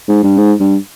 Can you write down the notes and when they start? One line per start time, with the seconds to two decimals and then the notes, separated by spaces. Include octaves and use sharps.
0.09 G#2
0.23 G2
0.37 G#2
0.60 G2